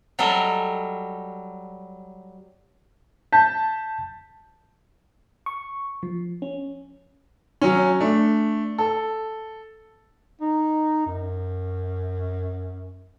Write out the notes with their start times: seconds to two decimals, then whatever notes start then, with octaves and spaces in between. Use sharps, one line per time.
0.19 F#3 G3 A4 A#4 D#5
3.33 A5 G6 B6
5.46 C#6
6.03 F3
6.42 C#4
7.61 F#3 C#4
8.00 A3 D4
8.78 A4
10.41 D#4
11.06 F#2